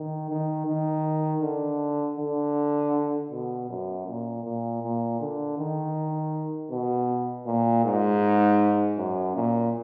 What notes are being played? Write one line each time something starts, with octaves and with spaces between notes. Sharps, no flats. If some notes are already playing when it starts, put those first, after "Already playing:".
Already playing: D#3
D#3
D#3
D3
D3
B2
F#2
A#2
A#2
A#2
D3
D#3
B2
A#2
G#2
F#2
A#2